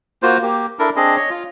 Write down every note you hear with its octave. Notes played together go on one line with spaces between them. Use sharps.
A#3 F4 F#4 C5
A#3 G4
D4 E4 A4 A#4
C4 D4 G#4 D#5
C#5 D#5
F4